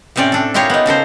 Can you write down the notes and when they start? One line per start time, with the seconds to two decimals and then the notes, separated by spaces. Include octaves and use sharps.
0.16 A2 C3 C4 C#4 D5
0.32 D4 A4
0.54 E4 F4 G4 G#4 A#4 C#5
0.70 B3 D#4
0.86 C#3 A4 A#4 C5